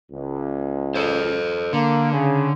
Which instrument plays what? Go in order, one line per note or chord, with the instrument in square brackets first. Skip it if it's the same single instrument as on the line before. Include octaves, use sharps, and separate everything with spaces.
[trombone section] C#2
[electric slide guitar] A4 C5
[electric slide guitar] D3 [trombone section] A#3
[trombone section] C#3